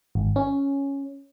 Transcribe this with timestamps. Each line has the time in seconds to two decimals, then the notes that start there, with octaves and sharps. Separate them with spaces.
0.15 G#1
0.36 C#4